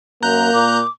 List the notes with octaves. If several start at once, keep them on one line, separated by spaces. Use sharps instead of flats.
F#2 A#3 A#5 F#6 G6
A#2 D6